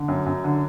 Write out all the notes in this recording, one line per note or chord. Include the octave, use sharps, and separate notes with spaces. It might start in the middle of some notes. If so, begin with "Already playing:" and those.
Already playing: D3
F#2
F#2
D3